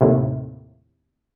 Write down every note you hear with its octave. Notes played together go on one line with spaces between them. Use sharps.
D#2 A2 C3